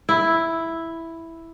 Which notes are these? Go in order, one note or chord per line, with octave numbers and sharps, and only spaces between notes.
E4